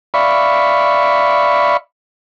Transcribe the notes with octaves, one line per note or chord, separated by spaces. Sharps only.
D5 E5 F5 B5 C#6